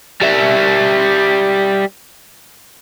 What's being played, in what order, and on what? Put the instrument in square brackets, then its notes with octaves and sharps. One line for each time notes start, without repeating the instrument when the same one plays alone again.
[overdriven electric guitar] G3 E5